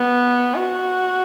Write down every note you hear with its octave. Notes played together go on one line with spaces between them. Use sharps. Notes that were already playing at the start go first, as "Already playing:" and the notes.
Already playing: B3
F#4